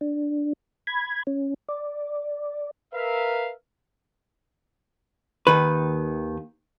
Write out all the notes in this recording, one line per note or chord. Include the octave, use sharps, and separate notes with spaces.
D4
B5 G#6
C#4
D5
A#4 B4 E5 F5
D#2 D#3 B4